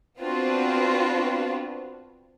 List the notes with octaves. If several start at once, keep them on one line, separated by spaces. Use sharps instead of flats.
B3 C4 D4 F4 F#4 B4